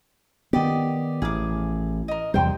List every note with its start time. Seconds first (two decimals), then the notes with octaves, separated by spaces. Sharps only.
0.53 D#3 B3 G4 D5 D#5
1.22 A1 G#4 D6
2.08 A#4 D#5
2.34 E2 C3 G3 C5 G5